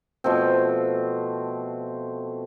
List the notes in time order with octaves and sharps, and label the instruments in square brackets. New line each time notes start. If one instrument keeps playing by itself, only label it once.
[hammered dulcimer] B2 F3 A3 C4